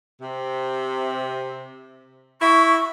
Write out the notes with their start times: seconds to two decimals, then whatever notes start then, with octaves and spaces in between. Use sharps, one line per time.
0.21 C3
2.42 E4 C#6